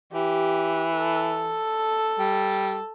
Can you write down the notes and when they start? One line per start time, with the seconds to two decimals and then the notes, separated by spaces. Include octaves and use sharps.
0.13 E3 G4
0.97 A4
2.19 G3